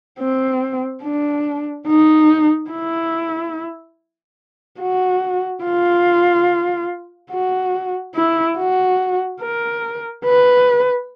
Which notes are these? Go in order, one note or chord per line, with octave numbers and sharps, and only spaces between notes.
C4
D4
D#4
E4
F#4
F4
F#4
E4
F#4
A#4
B4